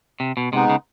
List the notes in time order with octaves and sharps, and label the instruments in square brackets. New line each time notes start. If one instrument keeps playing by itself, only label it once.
[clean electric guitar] C3
B2
[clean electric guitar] C3 [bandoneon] G#3 B3 D#4
[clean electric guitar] C#3